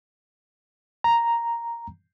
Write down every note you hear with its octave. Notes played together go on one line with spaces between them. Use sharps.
A#5